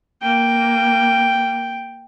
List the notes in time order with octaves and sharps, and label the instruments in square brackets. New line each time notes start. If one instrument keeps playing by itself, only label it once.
[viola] A#3 [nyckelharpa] G5